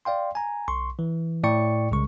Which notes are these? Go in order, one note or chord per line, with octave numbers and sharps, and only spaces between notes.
D5 F5 G5 C6
G#5 A#5
B1 C6 C#6
E3
A2 D5 G5 C#6 C#7
C2 C#3 G#3 C#6